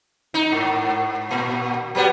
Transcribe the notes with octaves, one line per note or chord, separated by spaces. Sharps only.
D#4
G#2
A#2
F#3 G3 B3